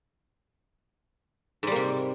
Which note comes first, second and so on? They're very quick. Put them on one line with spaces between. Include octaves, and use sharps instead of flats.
G#2 G3 A#3 C3